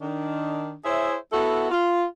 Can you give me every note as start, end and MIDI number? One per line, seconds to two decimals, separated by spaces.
0.01 0.75 51
0.01 0.75 62
0.85 1.16 64
0.85 1.16 68
0.85 1.16 72
0.85 1.16 73
0.85 1.16 76
1.33 1.69 59
1.33 1.69 64
1.33 1.69 66
1.33 1.69 69
1.71 2.04 65